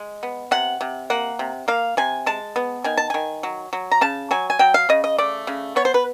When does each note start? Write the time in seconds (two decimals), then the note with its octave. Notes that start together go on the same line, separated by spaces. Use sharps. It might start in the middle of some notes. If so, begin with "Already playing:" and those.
Already playing: G#3
0.23 B3
0.51 C3 F#5
0.81 C3
1.10 A#3 F#5
1.39 C3
1.68 A#3 F5
1.97 C3 G#5
2.26 G#3 A5
2.56 B3
2.84 D#3 G#5
2.97 A5
3.10 D#3 G#5
3.43 F#3
3.73 F#3
3.91 A#5
4.01 C#3 A5
4.31 F#3 G#5
4.50 G#5
4.59 F#3 G5
4.74 F5
4.89 C#3 D#5
5.04 D#5
5.18 A3 D5
5.47 C#3
5.76 B3 C#5
5.85 C5
5.94 B4